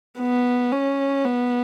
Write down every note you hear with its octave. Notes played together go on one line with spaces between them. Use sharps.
B3
C#4
B3